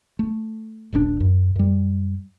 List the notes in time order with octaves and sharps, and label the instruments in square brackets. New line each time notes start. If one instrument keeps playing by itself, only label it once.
[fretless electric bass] A3
D#1 A#1 G#2 D4
F#2
F#2 G3